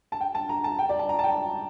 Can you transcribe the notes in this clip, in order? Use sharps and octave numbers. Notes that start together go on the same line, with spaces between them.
A5
G5
A5
A#5
A5
G5
D5
A5
A#5
A5
G5